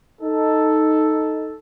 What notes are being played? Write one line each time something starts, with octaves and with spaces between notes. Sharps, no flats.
D#4 A4